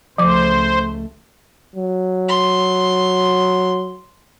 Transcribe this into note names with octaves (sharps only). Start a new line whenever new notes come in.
C#2 F3 A3 C5 D6
F#3
C6